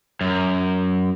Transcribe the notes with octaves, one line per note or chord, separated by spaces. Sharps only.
F#2